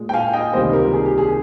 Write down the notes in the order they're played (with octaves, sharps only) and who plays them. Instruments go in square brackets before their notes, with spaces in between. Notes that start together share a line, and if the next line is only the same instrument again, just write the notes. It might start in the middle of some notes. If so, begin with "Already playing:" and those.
Already playing: [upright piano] A#2 G#3
G5
F5 G#5
D#5 G5
C#2 C3 D#3 G3 A#3 C5 D#5
G4 A#4
G#4
G4
G#4